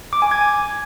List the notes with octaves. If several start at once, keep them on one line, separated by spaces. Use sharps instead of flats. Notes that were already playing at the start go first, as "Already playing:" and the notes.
D6
G#5
G#6
G#5